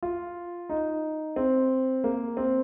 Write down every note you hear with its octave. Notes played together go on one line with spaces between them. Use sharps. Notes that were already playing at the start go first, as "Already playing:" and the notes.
F4
D#4
C4
A#3
C4